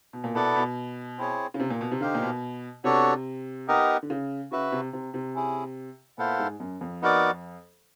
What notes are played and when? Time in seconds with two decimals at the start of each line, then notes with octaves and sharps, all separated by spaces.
0.13 B2
0.24 A#2
0.35 B2 B3 E4 A4 D5 F#5
0.56 B2
1.18 C4 E4 G#4 C#5
1.54 C#3
1.60 C3
1.70 A#2
1.81 B2
1.91 C3
2.01 D3 D#4 G4 C5 F5
2.14 A#2
2.23 B2
2.84 C3 B3 D4 F#4 A4 C#5
3.68 B3 D#4 G4 A#4 D#5
4.03 D3
4.10 C#3
4.52 C#3 F#4 B4 E5
4.72 C3
4.93 C3
5.14 C3
5.35 C#4 E4 G#4
6.18 A#2 B3 E4 A4 C5 F5
6.39 G#2
6.60 F#2
6.81 F2
7.02 B3 D#4 F#4 A#4 D5